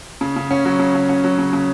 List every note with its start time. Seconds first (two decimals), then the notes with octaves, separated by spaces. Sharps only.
0.21 C#3
0.36 C#3
0.51 C#4
0.65 F#3
0.79 C#3
0.95 C#3
1.09 C#4
1.24 F#3
1.38 C#3
1.53 C#3